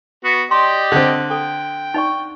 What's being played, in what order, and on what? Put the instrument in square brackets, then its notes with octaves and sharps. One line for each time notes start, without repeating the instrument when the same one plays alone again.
[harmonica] B3 F#4
[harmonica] G4 D5 D#5 [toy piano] C6
[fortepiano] D3 C4
[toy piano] A4 [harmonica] G5
[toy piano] D#4 D5 C#6